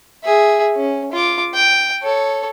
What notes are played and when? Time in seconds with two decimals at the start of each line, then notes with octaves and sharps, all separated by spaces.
0.23 G#4 E5
0.76 C#4
1.12 F4 D6
1.54 G5
2.02 A4 C#5